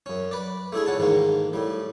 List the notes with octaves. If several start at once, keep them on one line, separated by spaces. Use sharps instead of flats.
F#2 C#4
B4 D5
A3 D4 E4 G#4
C#2 C#4 F#5 A5
A1 G#2 D#3 G#3 A#3
A2 G3